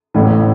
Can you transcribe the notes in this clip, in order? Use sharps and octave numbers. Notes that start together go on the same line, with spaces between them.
A1 A2 E3 A3